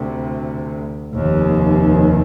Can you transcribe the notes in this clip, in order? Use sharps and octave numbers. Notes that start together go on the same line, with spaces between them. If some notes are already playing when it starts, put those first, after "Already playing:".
Already playing: D2 C3
F1 D#2